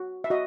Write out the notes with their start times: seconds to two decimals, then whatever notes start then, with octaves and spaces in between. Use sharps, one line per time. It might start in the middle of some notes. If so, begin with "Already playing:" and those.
Already playing: F#4
0.24 E5
0.30 F#4 D#5